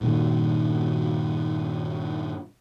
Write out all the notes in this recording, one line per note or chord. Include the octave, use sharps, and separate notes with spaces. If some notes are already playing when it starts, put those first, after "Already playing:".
G2 A#2 D#3